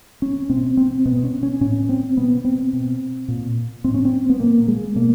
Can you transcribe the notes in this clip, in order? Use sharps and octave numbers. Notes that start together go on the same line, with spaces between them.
C#4
B2 C4
C4
B2 B3
C#4
C#4
A2 C#4
C4
B2 B3
C4
B2
A#2
A2 C4
C#4
C4
B3
A#2 A#3
G#3
B2 A#3